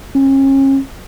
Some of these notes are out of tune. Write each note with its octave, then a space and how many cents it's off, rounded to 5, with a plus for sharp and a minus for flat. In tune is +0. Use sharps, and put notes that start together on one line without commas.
C#4 -35